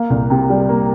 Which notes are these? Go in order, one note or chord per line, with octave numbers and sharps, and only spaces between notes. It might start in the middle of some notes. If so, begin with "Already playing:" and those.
Already playing: A#3 F5
C2
C3
G3
A#3